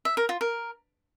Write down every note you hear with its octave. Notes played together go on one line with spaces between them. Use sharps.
E5
A#4
F4
A#4